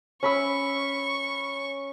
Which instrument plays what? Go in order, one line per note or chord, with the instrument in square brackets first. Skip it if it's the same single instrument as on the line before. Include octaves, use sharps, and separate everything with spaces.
[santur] C#4 B5 E6 [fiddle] C#6